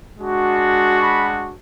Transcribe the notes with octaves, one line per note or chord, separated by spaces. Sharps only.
G#3 D4 F#4
B5